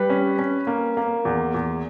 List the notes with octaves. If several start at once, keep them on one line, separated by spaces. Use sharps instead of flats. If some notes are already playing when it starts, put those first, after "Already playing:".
Already playing: G3 B4
C#4
C#4
A#3
A#3
E2
E2